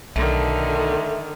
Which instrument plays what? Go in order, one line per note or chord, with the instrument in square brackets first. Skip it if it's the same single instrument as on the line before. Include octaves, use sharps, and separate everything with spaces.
[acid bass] B1 [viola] D3 D#3 [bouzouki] A3